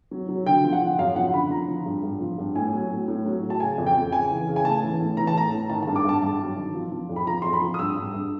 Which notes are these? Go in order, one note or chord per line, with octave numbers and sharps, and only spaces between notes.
F#3
F#3
D3 G5
F3
F#5
F3
F#2 F5
F3 F#5
D3 B5
F3 A#5
F3
G2
G2
F3
G2
A2 G#5
F#3
A2
A2
F#3
A2
A5
C#3 G#5
F2
G5
F2
C#3 G#5
E3
C#3
G#5
A2 A5
E3
A2
E3 A#5
A5
A2 A#5
A2
D#3 A5
A5
G2
D6
G2 A5
G2 A5
F#3
D#3
F3
F3
F2
B5
F3 A#5
F2 C6
B5
F3
D#6
G2 E6
G2
G2